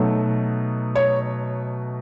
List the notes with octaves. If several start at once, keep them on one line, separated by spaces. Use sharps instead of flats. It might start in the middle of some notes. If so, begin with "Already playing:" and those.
Already playing: B2 F#3 A3 D#4
C#5